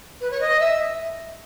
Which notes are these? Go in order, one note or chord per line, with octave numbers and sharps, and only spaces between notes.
B4
C#5
D#5
E5